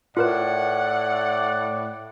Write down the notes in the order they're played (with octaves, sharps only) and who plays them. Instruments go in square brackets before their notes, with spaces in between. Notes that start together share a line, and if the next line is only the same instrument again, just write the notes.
[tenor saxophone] A2 [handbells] F4 A#4 B4 [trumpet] D5 [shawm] F#5